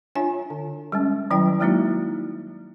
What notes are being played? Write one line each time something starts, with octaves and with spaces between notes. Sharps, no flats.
D4 F4 C#5 E5 G#5
D3
G3 G#3 C#4
D#3 F#3 G3 E4 G5
F#3 G#3 A#3 D#4 E4 F#4